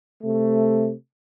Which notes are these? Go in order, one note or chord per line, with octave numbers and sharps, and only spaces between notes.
C3 A3